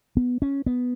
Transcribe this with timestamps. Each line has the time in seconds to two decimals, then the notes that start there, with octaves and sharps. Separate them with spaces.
0.17 B3
0.42 C#4
0.66 B3